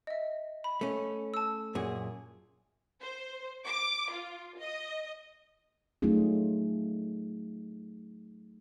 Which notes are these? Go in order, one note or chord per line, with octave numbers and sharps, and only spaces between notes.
D#5 E5
B5
A3 C#4
A5 E6
F#2 A#2 G#4
C5
D6
F4
D#5
F#3 A3 C#4 D#4 F4 G#4